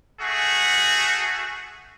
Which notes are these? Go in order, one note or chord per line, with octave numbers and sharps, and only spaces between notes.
A3 F#4 G#4